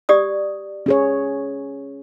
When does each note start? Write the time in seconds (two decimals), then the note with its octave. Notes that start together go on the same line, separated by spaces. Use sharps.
0.09 G4 D5 D#6
0.86 C#4 G#4 C#5